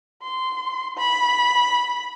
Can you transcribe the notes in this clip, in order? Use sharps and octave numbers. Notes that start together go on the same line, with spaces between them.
C6
B5